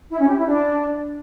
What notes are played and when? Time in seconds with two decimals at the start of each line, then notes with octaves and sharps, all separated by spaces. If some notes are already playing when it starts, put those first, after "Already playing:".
0.10 E4
0.19 C#4
0.28 G4
0.37 E4
0.46 D4